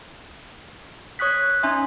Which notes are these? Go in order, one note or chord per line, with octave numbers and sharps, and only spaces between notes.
C#5 C#6 D#6 F#6 B6
C#4 D#4 E5 G#5 A#5 C6